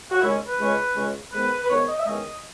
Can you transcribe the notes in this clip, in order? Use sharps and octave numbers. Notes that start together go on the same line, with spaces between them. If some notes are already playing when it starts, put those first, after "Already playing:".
F#4
D#2 C#3 G#3 C#4 E4
B4
C#2 C#3 G#3 C#4
C#2 C#3 G#3 C#4
G#2 D#3 G#3 B3 B4
B4
G#2 D#3 G#3 B3 C#5
D#5
E5
E2 D#3 G#3 C#4 D#5